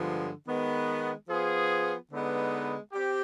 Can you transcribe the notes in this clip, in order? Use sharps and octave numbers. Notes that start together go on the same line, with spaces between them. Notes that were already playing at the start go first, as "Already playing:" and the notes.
Already playing: G2 D3 F3 G#3 B3
D#3 G#3 B3
F3 B3 F4 G#4
D3 G#3 B3 D#4 B4
C4 G4